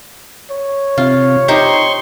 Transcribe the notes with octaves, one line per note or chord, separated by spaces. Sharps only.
C#5
C3 F4
D#4 G4 C5 C6 C#6